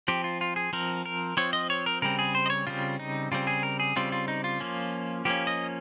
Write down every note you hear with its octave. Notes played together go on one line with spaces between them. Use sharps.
F3 C4 G4
F4
F4
G#4
F3 C4 A#4
A#4
F3 C4 C#5
D#5
C#5
A#4
C#3 G3 C4 A#4
G#4
C5
D#5
C#5
C#3 G3 C4 F4
D#4
C#3 G3 C4 F4
G#4
A#4
G#4
C#3 G3 C4 F4
F4
D#4
F4
F3 A#3 C#4
F3 A#3 C#4 G4
D#5